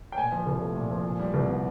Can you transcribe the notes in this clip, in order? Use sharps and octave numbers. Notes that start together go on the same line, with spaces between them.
G5
A#2 G#5
F3
C2
A3
A#2
F3
A#2
G3
C2
B3